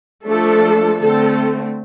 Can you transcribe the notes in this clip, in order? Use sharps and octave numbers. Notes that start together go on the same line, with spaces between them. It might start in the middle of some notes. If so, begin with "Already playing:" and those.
F3 A3 D4 A4
D3 A3 C4 A4